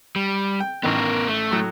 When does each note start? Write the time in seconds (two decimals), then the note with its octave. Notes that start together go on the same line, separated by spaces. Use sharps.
0.16 G3
0.60 G5
0.83 A1 D#3 B3 A#4
1.28 A3
1.51 A2 F#3